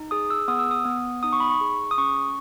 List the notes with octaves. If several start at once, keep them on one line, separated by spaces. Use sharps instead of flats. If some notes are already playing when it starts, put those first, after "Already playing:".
Already playing: D#4
G#4 D#6
E6
B3 D#6
E6
D#6
B3
D#4 D#6
C#6
B5
C#6
G#4
D#6
C#4 C#6